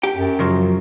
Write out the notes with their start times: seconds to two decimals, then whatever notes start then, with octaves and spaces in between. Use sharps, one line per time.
0.03 G4 G5
0.16 F#2
0.39 C#3 F3 F#3